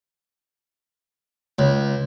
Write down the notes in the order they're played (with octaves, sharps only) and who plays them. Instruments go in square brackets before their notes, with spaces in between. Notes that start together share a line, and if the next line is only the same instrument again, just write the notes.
[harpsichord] C#2